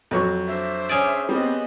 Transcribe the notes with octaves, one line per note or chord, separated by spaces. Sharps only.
F2 F#3 C#6
D4 C5 E5
C#4 G#4 D5
G3 B3 C4 D#5